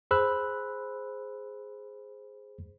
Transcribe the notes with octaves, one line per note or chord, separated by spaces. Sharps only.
G#4 C5 B5 E6 F#6